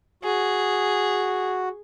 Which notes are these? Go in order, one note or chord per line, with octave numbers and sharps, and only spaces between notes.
F#4 G#4